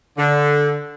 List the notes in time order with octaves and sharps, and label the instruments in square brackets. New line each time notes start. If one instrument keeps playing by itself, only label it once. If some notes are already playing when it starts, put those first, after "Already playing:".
[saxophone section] D3